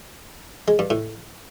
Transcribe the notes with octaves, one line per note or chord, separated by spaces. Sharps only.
G#3
G2
A2